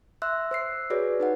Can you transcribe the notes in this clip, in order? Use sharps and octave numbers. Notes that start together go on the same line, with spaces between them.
E5 C6 E6 F#6
C5 E6 C7
F#4 G#4 B4 C#5 D5
D#4 B4 F#5